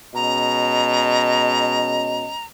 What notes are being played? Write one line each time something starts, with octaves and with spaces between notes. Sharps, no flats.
B2 G#3 C#4 D#5 A#5